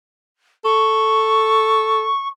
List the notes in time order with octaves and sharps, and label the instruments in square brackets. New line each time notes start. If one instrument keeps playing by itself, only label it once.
[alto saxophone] A4 [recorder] C#6